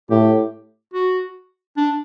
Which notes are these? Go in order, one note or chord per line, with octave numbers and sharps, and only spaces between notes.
A2 G4
F#4
D4